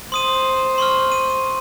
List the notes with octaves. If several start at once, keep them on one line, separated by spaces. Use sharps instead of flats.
C5 C6 D#6 D#7
C6 C#6 F6
D#7